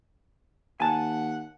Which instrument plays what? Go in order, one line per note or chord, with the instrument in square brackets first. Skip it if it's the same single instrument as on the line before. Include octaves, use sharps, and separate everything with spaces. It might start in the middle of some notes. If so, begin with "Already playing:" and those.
[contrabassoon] D#2 [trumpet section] F#5 [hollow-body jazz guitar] G#5 A5